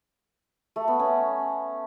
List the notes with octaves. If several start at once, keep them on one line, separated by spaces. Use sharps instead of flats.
A3
B3
C#4